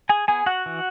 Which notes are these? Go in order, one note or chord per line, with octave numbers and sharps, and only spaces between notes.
G#4 G#5
B3 G#4 G#5
F#4 F#5
E3